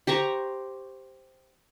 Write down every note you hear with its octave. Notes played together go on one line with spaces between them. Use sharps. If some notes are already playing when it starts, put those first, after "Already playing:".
G4 C5 A#5 C#6